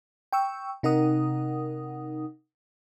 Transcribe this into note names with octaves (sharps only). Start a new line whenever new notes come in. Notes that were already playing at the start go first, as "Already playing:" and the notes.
G5 C#6 E6
C3 D#4 A#4 F#5 D#6